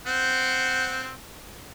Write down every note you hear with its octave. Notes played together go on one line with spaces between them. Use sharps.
C4 C5 F#5